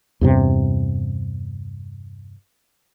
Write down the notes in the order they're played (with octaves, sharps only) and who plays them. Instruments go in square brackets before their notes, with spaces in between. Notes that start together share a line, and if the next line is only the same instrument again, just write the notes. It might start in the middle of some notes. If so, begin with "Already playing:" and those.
[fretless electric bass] E2 G2 C3